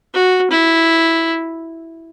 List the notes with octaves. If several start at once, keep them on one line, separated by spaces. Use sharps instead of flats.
F#4
E4